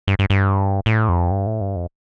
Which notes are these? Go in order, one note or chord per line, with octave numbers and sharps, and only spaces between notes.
G2
G2
G2
A2
F2
G2
A2
G2
F2